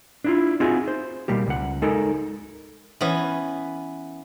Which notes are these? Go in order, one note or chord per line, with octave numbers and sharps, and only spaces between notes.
D4 E4 F4
C4 D#4 F4 F#4 G#4 E5
C5
B2 G3 A#3 G4
C#2 F#5
G#3 D#4 A4 A#4
E3 B3 C#4